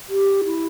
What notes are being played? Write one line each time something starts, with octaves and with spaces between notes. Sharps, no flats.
G4
E4